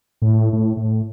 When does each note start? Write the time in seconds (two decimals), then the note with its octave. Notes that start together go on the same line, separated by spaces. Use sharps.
0.22 A2
0.53 A2
0.77 A2